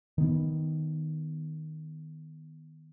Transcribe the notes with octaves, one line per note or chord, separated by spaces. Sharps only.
D#3 B3